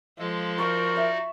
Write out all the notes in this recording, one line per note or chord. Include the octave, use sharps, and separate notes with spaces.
F3 G#3 A4
D#4 F#4 A#4 D5 C#6
E5